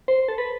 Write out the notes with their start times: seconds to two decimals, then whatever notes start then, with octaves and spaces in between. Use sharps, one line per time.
0.08 C5
0.28 A4
0.38 B4